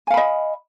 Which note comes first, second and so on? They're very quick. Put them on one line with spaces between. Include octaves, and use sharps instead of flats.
G#5 F5 B5 D#5